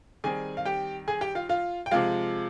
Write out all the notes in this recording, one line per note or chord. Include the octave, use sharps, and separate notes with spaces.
D#3 G3 C4 G#4 G#5
F5
G4 G5
G#4 G#5
G4 G5
F4 F5
F4 F5
G5
C3 F3 G#3 F4 F5